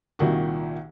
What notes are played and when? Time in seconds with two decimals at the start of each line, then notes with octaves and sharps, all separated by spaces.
0.19 C2 A#2 D#3 F#4